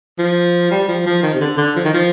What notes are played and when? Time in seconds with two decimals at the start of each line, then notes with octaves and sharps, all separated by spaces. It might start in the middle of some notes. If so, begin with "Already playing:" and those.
0.19 F3
0.71 G3
0.88 F3
1.06 F3
1.22 D#3
1.34 C3
1.41 D3
1.57 D3
1.76 F3
1.85 D#3
1.94 F3